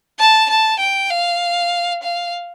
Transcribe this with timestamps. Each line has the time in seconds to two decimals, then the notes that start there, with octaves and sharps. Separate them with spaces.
0.20 A5
0.50 A5
0.80 G5
1.10 F5
2.03 F5